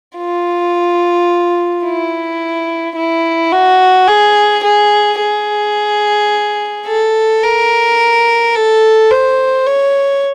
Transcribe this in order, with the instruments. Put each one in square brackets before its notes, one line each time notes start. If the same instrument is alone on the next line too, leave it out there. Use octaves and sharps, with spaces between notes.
[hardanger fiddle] F4
E4
E4
F#4
G#4
G#4
G#4
A4
A#4
A4
C5
C#5